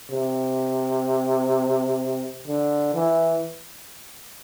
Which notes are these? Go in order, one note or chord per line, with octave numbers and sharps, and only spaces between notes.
C3
D3
E3